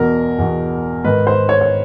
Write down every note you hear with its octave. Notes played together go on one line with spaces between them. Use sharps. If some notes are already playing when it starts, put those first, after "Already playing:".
Already playing: E2 B2 A#4
E2 B2
G#2 D#3 B4
C5
C#5
C#5